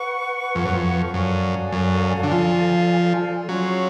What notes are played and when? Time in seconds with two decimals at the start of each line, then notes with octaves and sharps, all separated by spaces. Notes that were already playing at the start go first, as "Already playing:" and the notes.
Already playing: B4 F#5 C#6
0.55 F2
0.65 F#2
0.73 F2
1.14 F#2 A4 D5 F5 G#5
1.72 F#2
2.23 D3
2.31 F3
3.48 F#3 C#4 F4 G#4 C#5